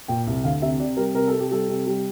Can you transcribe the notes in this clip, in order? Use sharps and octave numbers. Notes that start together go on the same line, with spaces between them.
A#2 G5
C2
D2 F5
C3 E5
C3 D5
G3 A#4
C3 A#4
A4
C3
G4
G3 A4
C3
G3